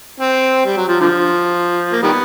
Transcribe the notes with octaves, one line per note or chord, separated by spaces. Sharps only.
C4
G3
F#3
F3
D3 F3
A#3
D#3 G3 B3